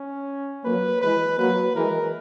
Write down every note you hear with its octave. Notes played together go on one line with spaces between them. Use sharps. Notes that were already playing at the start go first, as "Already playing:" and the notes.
Already playing: C#4
F#3 A#3 B4
E3 G#3 B4
F#3 A#3 B4
E3 G#3 A#4